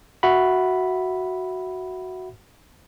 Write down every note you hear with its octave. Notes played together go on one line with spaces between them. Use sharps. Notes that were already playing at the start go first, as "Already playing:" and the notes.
F#4 E5 F#5 B5